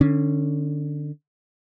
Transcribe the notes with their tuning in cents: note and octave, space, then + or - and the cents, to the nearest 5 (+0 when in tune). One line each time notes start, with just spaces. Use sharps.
D3 +25 C#4 +0